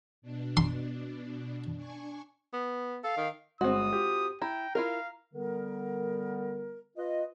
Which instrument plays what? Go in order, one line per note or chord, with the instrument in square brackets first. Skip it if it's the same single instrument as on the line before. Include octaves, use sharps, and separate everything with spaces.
[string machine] B2 D4
[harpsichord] C6
[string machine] D4 G#5 C#6
[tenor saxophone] B3
[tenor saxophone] A4 [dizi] F5
[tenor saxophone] D#3
[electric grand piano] G1 G#3 [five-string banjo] C4 F#4 [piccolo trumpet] D#6
[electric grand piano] F4 G4
[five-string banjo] E4 [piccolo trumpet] G5 [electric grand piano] A#5
[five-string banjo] E4 F4 A#4 [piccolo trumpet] F5
[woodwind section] D3 G3 B3 A#4
F4 B4 D#5